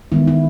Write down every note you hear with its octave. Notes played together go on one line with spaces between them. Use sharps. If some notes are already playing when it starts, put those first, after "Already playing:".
D#3 G#3 B3 E4
E4